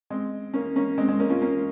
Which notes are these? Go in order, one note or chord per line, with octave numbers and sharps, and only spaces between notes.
G#3 C4
A#3 C#4
A#3 C#4
G#3 C4
G#3 C4
A#3 C#4
C#4 F4
A#3 C#4